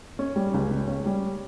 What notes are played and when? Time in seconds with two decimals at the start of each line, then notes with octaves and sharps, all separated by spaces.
0.19 C#4
0.36 G3
0.54 C#2
0.71 C#3
0.88 C#4
1.06 G3